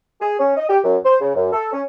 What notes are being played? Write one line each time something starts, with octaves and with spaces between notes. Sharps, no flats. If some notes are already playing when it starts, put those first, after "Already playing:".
G#4
C#4
D#5
G4
F#2
C5
C#3
F#2
A4
C#4